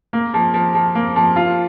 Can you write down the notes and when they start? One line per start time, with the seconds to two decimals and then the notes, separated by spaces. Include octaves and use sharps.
0.13 A#3
0.34 F3
0.54 F3
0.74 F3
0.95 A#3
1.16 F3
1.36 F4